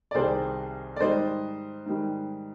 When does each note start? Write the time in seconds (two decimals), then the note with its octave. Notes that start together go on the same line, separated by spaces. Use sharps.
0.11 D5
0.14 C2 C3 D#3 G3 G#4 C5
0.96 D5
1.00 G#2 D#3 G3 C5 D#5
1.86 G#2 D#3 G3